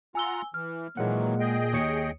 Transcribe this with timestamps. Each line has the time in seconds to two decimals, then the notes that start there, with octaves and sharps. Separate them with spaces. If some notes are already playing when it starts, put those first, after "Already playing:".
0.15 F4 F#5 G#5 A#5 E6 G7
0.54 E3 F6
0.97 A#2 D#3 E3 F#3 G#3 A#3 F#5
1.40 G#4 D#5 G5
1.73 D#2 C#5 D#6 C#7